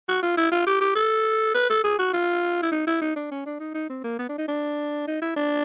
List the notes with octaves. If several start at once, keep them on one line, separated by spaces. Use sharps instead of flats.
F#4
F4
E4
F4
G4
G4
A4
B4
A4
G#4
F#4
F4
E4
D#4
E4
D#4
D4
C#4
D4
D#4
D#4
C4
A#3
B3
D4
D#4
D4
D#4
E4
D4